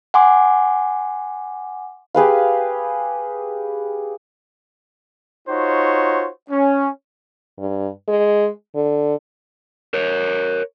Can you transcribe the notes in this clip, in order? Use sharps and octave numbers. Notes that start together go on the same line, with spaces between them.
F#5 G#5 C6 D6
G4 G#4 B4 F5
D#4 F4 F#4 C5 C#5
C#4
G2
G#3
D3
A#4 C#5